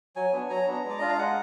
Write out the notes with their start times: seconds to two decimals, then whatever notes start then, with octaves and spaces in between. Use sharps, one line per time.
0.16 F#3 G#5
0.33 B3 D4
0.50 F#3 A#5
0.67 B3 D4
0.84 G#3
0.90 D5
0.99 D4 F4 D#5
1.09 F5
1.18 G#3 F#5